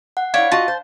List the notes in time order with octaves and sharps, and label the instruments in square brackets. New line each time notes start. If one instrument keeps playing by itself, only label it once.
[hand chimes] F#5
[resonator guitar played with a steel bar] E4 D5 [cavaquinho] C#5 [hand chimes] F5
[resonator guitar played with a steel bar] F4 F#4 D#5 [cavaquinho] A5
[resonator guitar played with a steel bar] C5